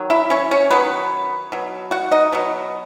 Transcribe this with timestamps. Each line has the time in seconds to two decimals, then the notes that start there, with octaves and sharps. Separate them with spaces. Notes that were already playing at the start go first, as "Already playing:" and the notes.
Already playing: D#3 F#3
0.10 E4 E5
0.30 C#4 C#5
0.51 C#4 C#5
0.71 D#3 F#3 B3 B4
1.52 B2 F#3
1.91 F#4 F#5
2.11 D#4 D#5
2.32 B2 F#3 B3